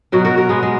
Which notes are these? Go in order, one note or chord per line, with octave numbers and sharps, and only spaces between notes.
B2 F#3 F#4 A#4
F#4 A#4
F#4 A#4
G#3 B3
G#3